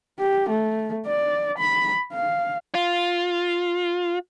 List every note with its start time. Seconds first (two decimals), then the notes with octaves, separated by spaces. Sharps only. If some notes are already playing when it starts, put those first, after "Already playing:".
0.20 G4
0.50 A3
1.07 D5
1.59 B5
2.13 F5
2.75 F4